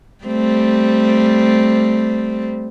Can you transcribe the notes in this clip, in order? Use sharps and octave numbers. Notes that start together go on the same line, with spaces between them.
G3 A3 C4